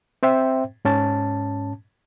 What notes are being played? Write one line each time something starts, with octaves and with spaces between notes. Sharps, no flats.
C4 C5 E5 G5
G#2 C#4 A5